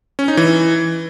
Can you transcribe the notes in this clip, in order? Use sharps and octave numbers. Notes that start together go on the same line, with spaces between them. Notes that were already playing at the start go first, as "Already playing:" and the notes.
C#4
D#4
E3